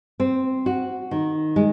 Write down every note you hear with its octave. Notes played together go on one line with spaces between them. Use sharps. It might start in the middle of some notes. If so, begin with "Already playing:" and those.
C4
F#4
D#3
G#3